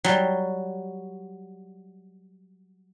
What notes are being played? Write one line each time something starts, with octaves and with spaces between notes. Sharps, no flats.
F#3 G3